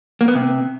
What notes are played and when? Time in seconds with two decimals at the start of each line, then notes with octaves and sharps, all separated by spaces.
0.21 A#3
0.28 B3
0.35 C3